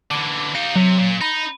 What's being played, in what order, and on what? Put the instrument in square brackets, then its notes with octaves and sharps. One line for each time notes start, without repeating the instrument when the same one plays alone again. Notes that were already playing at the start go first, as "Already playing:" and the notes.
[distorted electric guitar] D3 E3 [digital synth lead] D6
[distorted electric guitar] D#4 G4 [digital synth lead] F5
[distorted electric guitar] C3 [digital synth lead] F#3
[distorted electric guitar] A#2
[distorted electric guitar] D#4 [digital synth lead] B5